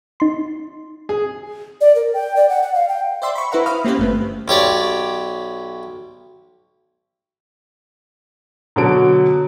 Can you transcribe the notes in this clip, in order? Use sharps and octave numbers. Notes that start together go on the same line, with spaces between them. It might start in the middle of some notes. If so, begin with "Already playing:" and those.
D#4 C6
G#4
D5
A#4
G5
D5
F#5
F#5
F5
G5
C5 D5 E5 C6
B5 C#6
E4 B4 C5 E5 F#5 A#5
F5 B5 D#6 F6
A#3 C4 C#4 G4 B4 C5
G1 A3 B3
B1 G4 C#5 D5
B2 D3 F#3 D7